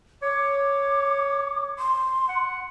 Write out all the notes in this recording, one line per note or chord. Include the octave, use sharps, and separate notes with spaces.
C#5 D6
C6
F#5